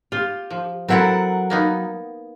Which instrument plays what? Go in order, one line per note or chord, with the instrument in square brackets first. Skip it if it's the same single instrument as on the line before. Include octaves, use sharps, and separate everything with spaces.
[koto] F4 [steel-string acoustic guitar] G4
[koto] F3
[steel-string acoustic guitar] F#3 A#4 F#5 [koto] C4 E4 A4
[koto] A#3 B3 D#4